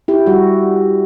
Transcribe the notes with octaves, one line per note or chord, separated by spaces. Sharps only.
E4 G4
G3 F#4